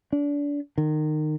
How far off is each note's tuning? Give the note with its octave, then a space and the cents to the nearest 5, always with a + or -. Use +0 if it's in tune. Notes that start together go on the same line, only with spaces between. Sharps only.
D4 -30
D#3 -25